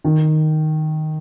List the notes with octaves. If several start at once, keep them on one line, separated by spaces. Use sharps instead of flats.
D#3